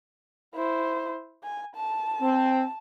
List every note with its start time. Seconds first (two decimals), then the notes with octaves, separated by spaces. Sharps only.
0.55 E4 C5
1.43 G#5
1.75 A5
2.21 C4